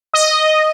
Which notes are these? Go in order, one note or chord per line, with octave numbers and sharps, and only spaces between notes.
D#5